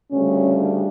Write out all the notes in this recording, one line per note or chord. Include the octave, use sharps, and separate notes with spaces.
D2 C#3 G3 C#4
D4